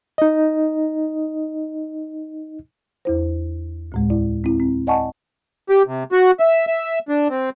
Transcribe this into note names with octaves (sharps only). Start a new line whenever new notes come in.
D#4 D#5
E2 E4 C5
D2 A2 G#3
E4 D5
C4 E4
C4
D5 D#5 F#5 G#5 A5 C#6
G4
C3
F#4
E5
E5
D4
C4